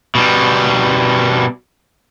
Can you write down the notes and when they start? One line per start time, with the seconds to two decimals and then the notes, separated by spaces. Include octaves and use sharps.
0.15 B2 G3